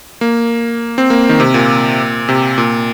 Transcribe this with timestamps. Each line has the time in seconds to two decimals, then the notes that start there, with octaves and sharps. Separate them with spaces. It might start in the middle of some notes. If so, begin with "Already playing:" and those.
0.21 A#3
0.98 C4
1.10 A#3
1.29 D#3
1.40 C3
1.54 A#2
2.29 C3
2.58 A#2